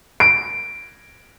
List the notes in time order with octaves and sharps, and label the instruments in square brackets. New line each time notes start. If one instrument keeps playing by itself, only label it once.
[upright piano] D7